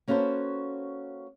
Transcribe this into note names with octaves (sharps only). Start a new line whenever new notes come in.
A#3 C#4 F#4 A4 B4 C5